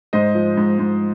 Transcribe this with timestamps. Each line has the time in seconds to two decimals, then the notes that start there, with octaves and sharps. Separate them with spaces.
0.13 G#2 C5 D#5
0.35 F3
0.57 G#2
0.79 G#2